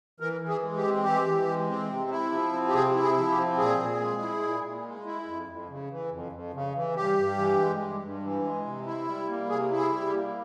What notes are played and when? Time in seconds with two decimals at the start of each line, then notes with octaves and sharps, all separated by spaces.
0.20 E3 A#4
0.41 E3
0.49 G#4
0.63 G#3
0.77 G4
0.84 C4
1.03 E3 G4
1.26 E3
1.47 G#3
1.68 C4
1.90 C3
2.10 E4
2.31 F3
2.53 C4
2.68 G4
2.74 C3 G#4
2.95 E4
3.02 G#4
3.17 F3
3.30 G4
3.37 C4
3.58 A#2 G#4
3.79 A#2
4.01 G#3
4.22 E4
4.43 A#2
4.64 A#2
4.85 G#3
5.06 E4
5.27 F2
5.49 F2
5.69 C#3
5.90 E3
6.11 F2
6.32 F2
6.54 C#3
6.75 E3
6.96 G2 G4
7.18 G2
7.38 E3
7.60 G#3
7.80 G2
8.02 G2
8.23 E3
8.44 G#3
8.65 C3
8.86 E4
9.07 G3
9.28 A#3
9.50 C3 G#4
9.71 E4
9.78 G#4
9.92 G3
10.06 G4
10.13 A#3